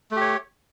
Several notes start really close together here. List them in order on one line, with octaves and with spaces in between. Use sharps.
A3 G4 C#5